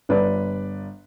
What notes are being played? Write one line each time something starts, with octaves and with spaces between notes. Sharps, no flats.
G1 B4 D5